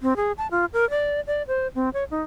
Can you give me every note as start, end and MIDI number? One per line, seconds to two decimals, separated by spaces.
0.02 0.16 60
0.16 0.32 68
0.38 0.47 81
0.51 0.65 65
0.73 0.89 70
0.90 1.21 74
1.27 1.43 74
1.48 1.68 72
1.75 1.89 60
1.94 2.04 73
2.11 2.22 63